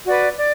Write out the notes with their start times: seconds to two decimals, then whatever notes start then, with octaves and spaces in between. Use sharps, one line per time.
0.06 F#4 B4 D5
0.36 D5